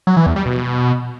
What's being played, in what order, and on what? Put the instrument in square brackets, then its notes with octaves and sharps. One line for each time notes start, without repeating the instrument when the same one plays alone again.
[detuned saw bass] F#3
E3
E2
G3
B2